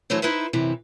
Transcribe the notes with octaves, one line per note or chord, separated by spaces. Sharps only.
D3 E3 F#3 A3 C5 C#5
D#4 E4 B4 C5 E5
F#2 C3 E3